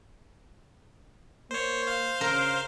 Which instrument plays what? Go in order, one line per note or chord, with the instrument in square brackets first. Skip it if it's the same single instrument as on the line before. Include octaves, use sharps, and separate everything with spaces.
[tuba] A#3 [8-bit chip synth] C5 C#5
[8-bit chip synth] C5 F5
[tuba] C#3 [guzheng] A#4